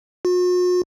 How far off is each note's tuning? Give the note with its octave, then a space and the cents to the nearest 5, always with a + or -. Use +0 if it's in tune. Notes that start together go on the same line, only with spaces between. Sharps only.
F#4 -45